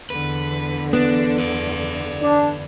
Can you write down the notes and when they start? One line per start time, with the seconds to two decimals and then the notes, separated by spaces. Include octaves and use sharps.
0.10 E2 D3 B4
0.93 B3 D4
1.38 B4 D5
2.22 D4